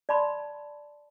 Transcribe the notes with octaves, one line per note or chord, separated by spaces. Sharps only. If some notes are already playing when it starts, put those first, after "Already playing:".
D5 A5 B5 C6